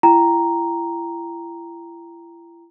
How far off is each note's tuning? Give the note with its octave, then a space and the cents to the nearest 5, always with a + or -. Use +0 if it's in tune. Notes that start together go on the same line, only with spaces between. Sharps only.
E4 +40 G5 +0 A#5 +0